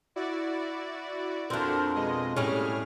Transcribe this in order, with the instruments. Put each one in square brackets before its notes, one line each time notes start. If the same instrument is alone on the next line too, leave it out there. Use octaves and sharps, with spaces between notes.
[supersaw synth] E4 F#4 D5
[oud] F2 C4 [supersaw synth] D4 F#4 A#4
[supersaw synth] B2 G#3 D#5
[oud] A2 G3 C#4 [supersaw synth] G#4 F6